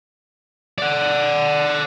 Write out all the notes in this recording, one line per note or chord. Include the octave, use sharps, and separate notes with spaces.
D5 F#5